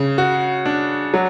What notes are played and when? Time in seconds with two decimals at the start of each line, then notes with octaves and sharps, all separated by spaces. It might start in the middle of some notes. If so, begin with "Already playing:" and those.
Already playing: C#3
0.18 F#4
0.66 D4
1.14 F#3